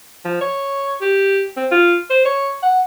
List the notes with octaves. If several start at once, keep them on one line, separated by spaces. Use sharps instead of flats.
F3
C#5
G4
C4
F4
C5
C#5
F#5